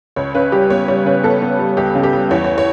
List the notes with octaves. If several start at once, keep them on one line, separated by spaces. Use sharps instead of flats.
C#2 C#5
C#3 B4
G3 G4
B3 C#5
G3 C#5
C#3 B4
B3 A4
B3
G3
C#2 G4
C#3
G4
G3
E2 C#5
C#5
C#5